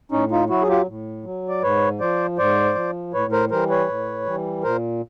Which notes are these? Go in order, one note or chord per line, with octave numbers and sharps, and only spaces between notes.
A2 C#4 D#4
D#4 F4
F#3 E4 F#4
G#4
F4 G4
A2
F#3
D5
G#2 B4 C#5
F3 C5 D5
G#2 C5 D5
F3
A2 B4 C#5
A#4 C5
E3 G3 A#4 C5
B4 C#5
A2
E3 G3
A#2 A#4 C5